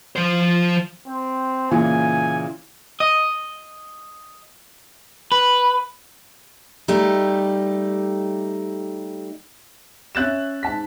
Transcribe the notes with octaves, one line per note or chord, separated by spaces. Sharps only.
F3 C5
C4
A#2 C#3 E3 G#5
D#5
B4
G3 A3 D#4 G4
C#4 E5 F#6 A6 E7
G#2 A5 B6